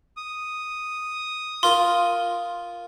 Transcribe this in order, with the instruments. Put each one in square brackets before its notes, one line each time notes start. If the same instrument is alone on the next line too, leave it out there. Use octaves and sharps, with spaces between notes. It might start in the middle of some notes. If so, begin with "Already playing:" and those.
[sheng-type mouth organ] D#6
[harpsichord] F4 A#4 [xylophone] C6